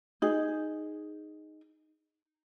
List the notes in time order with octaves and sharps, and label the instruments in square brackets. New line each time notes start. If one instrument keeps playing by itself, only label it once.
[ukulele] D#4 G#4